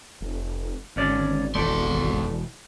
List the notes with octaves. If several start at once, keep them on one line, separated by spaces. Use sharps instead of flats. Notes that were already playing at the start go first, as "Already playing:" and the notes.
F1
G#1 D2 C#4 D5
E1 E2 E3 A3 D5 C6